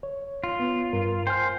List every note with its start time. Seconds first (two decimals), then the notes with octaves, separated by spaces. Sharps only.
0.03 C#5
0.44 F4
0.59 B3
0.93 G2 A#4
1.27 C5 G5 G#5 F6